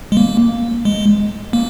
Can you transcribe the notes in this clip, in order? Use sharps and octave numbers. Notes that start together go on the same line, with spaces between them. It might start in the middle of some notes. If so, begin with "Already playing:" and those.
G#3
A#3
G#3
A#3